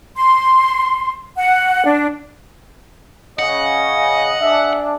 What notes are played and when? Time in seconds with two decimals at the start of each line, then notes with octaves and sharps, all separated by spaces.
0.16 C6
1.37 F#5
1.85 D4
3.39 C#3 D#5 F#5
4.41 D4 G#4 E5